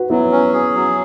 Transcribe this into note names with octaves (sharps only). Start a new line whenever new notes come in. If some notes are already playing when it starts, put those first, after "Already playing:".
Already playing: F#4 B4
F#3 B3 E4
C#4
G#4
F#3